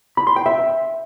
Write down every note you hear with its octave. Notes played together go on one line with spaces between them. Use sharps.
B5
C6
G5
E5